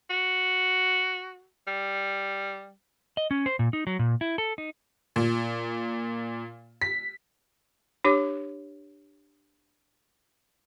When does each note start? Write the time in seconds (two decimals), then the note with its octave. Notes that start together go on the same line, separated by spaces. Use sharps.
0.10 F#4
1.67 G3
3.17 D#5
3.31 C#4
3.46 C5
3.59 A#2
3.73 D#4
3.87 F#3
3.99 A#2
4.21 E4
4.38 A4
4.58 D#4
5.16 A#2
6.82 B6
8.05 D4 G4 C#5 D6